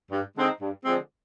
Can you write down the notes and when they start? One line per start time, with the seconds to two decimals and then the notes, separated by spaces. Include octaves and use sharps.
0.11 G2
0.36 D3 G#3 C4 D#4
0.61 G2
0.85 D3 F3 G#3 C4